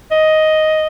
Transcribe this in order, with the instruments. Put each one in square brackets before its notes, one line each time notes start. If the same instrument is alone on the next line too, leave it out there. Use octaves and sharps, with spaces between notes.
[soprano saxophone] D#5